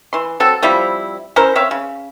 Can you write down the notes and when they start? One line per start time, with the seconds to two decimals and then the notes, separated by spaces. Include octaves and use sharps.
0.13 E3 C6
0.40 F#3 C4 A4
0.63 F3 G3 C4 E4
1.36 C#4 E4 A#4 C5
1.55 C4 C#5 E5 F5
1.71 C#3